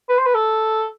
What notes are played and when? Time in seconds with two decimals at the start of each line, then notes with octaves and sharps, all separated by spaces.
0.09 B4
0.18 C5
0.26 B4
0.35 A4